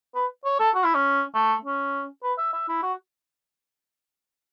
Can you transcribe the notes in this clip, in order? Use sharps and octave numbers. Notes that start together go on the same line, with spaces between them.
B4
C#5
A4
F#4
E4
C#4
A3
C#4
B4
E5
E5
E4
F#4